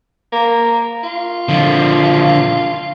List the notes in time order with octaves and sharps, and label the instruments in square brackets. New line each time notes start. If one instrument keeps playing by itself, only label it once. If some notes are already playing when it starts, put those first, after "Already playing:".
[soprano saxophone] A#3
F4
[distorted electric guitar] D3 F3